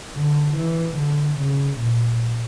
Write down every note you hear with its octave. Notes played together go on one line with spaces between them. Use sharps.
D3
E3
D3
C#3
A#2